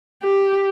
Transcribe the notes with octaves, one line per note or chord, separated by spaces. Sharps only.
G4